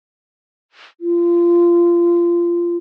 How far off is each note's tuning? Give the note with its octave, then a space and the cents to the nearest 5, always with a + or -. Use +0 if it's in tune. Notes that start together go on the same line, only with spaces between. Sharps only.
F4 -20